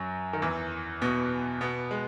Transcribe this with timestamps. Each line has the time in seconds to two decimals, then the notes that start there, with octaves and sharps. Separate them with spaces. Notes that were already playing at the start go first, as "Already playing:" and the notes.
Already playing: F#2 F#3
0.33 D#3
0.42 E2 E3
1.02 B2 B3
1.61 B2 B3
1.91 G#3